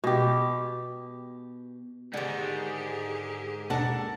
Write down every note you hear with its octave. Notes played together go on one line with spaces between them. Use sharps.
B2 G4
G#2 D3 D#3 G4 G#4
D#2 B2 D4 A4 A#4 F#5